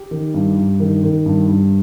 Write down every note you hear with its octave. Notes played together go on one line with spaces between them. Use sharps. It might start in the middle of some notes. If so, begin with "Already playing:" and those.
Already playing: G4
D#3
G2
G2
D#3
D#3
G2
G2